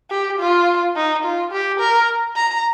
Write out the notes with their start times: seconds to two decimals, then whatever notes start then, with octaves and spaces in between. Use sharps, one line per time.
0.10 G4
0.39 F4
0.96 D#4
1.24 F4
1.52 G4
1.80 A#4
2.36 A#5